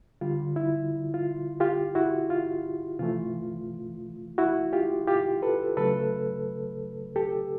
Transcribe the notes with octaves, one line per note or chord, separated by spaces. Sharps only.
D3 G3 F4
E4
F4
F4 G4
E4 F#4
F4
C3 E3 A3 F4
E4 F#4
F4 G4
F4 G4
A4 B4
C#3 F#3 A3 A4 B4
G4 A4